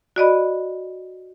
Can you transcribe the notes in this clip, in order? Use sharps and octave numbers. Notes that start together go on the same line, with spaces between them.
F#4 D5 D#5 B5